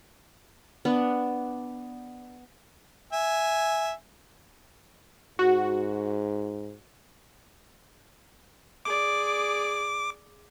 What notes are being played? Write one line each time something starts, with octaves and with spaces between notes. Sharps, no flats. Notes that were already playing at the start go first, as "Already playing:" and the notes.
B3 D4
E5 G#5
G#2 F#4
G#4 D5 D6